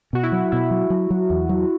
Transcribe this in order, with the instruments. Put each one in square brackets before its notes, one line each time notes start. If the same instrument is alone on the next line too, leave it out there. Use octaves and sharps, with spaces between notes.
[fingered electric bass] B2 [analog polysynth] F#4
[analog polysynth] E4
[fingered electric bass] F#3
[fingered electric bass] B2 [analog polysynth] E4
[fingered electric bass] F#3
F#3
F#3
E2
F#3